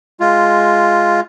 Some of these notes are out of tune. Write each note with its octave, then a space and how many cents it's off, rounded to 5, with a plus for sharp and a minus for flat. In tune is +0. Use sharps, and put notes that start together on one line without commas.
G#3 +0 F4 +0